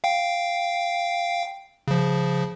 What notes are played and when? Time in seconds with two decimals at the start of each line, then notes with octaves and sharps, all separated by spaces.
0.04 F5 G5
1.88 C#3 F3